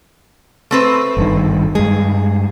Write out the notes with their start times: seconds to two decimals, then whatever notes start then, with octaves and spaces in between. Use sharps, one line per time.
0.71 A3 C4 B4
1.17 G#1 G2 D#3
1.75 G2 G#3 G#4